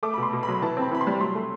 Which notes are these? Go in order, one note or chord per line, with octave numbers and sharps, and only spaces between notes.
A3 D6
B2 B5
C6
B2
B5
F#3
E3 A5
C4 B5
E3 B5
C6
G3
F#3 C6
A3